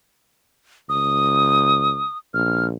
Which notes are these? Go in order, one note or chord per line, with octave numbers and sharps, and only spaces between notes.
C#2 D#6
A#1 F6